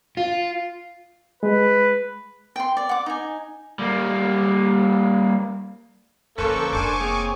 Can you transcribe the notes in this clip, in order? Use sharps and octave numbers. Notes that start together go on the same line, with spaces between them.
F4
G#3 B4
G5 C6
D5
F#5 D6
D#4 G#5
G3 A#3
F2 D3 A#3 C#4 A4 B4 C5 C#6
F1 D4 A4 C5 G#5 C#6 D6
A#3 C4 G#4 C#5